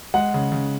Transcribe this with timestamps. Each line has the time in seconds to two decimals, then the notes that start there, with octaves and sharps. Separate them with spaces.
0.14 G#3 F#5
0.34 C#3
0.52 C#3